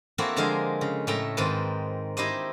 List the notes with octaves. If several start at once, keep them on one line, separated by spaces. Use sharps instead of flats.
A#3 C4 E4 F#4 A4 E5
D3 F3 G#3 G#4 A#4 C5
C#3
A2 A3 A4 E5 G5 A#5
G#2 D#3 C4 D#4 B4 A5
D#4 E4 G4 C5 D#5